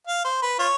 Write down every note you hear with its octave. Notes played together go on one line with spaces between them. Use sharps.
F5
C5
B4
F4 C#5